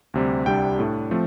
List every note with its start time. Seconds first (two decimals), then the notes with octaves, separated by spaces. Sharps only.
0.14 D2 C3 G3 C4
0.46 C2 C3 G3 D4 G5
0.79 A2 A3 D4
1.11 F3 A3 C4